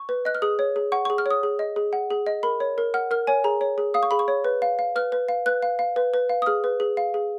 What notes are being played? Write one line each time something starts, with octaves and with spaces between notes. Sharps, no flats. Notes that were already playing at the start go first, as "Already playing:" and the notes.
Already playing: C#6
B4
D#5 F#6
F6
G#4 D#6
C#5
G#4
F#5 C#6
G#4 C#6
F6
C#5 D#6
G#4
D#5
G#4
F#5
G#4
D#5
A#4 B5
C#5
A#4
F#5 F6
A#4 F6
C#5 G#5
G#4 A#5
C#5
G#4
F5 D#6
C#6
G#4 B5
C#6
C#5
B4
F5
F5
B4 F6
B4
F5
B4 F#6
F5
F5
B4
B4
F5
D#6
G#4 F6
B4
G#4
F5
G#4